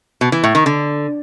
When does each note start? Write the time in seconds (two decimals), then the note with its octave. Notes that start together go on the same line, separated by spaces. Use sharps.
0.21 B2
0.32 E3
0.44 A2
0.55 D#3
0.66 D3